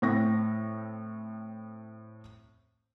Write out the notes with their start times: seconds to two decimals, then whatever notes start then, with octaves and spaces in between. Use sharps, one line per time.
0.02 A2 C4 C#6 A#6